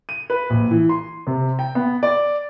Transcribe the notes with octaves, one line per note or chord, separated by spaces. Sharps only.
D#7
B4
A#1
E3
C6
C3
G5
B3
D5